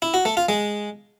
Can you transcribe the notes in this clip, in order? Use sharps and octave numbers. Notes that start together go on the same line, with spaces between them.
E4
F#4
A3
F4
G#3